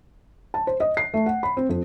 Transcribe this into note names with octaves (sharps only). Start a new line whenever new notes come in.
A5
C5
D#5
C7
A3
F#5
B5
C4
F2